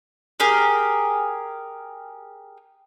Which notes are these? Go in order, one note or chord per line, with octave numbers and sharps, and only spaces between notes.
G4 G#4 A#4